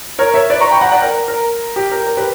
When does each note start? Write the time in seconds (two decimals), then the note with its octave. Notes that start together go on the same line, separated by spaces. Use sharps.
0.19 A#4 C#5
0.34 C#5 E5
0.50 B4 D5
0.60 A#5 C#6
0.71 G5 B5
0.81 F#5 A#5
0.87 G5
0.92 D5 F#5
1.02 A#4
1.28 A#4
1.76 G4
1.91 A#4
2.07 A#4
2.17 G4 B4